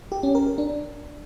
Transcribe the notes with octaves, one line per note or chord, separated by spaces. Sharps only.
G4
C#4
A#4
A#4
D4